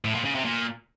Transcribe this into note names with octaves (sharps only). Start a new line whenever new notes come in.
A2
A#2
C#3
C3
A#2